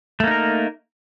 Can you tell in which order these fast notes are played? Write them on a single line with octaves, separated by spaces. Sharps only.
A3 A#3 D#4 A#4